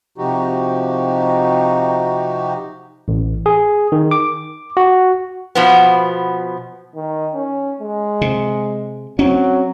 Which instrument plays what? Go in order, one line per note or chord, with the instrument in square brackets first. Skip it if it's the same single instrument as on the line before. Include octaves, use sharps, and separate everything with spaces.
[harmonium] C3 F3 D#4 F#4 G4
[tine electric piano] A1
G#4
D#3
D6
F#4
[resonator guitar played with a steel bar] B2 F3 B3
[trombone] D#3
C#4
G#3
[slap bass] C3
[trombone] F#3 [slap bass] C4 C#4